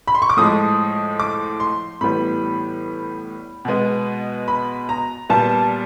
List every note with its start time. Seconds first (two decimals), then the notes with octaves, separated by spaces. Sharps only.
0.07 B5
0.15 C6
0.22 C#6
0.30 D6
0.37 A2 F3 G#3 D#6
1.20 D6
1.60 C6
2.01 A2 E3 G3 B3 B5
3.65 B2 G#3 B3
4.48 B5
4.89 A#5
5.30 A#2 G3 B3 A5